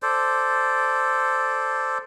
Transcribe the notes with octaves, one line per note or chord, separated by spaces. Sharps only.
A4 C5 D5